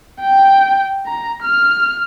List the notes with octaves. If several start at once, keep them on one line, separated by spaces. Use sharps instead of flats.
G5
A#5
F6